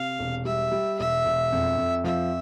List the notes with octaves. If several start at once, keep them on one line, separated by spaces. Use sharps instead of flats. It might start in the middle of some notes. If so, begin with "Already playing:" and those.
Already playing: C3 F5
E1
G3 E5
G3
E1 E5
E1
F2
F2
F3 E5